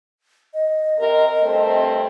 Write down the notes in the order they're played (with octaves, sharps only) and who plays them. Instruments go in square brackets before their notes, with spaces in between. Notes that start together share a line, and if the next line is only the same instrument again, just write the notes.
[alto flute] D#5
[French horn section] C3 A#4
G2 A3 C4